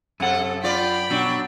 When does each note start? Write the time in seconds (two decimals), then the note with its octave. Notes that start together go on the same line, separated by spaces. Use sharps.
0.20 F#2 C3 A4 F#5
0.64 F4 D5 G5 B5
1.10 B2 F#3 D4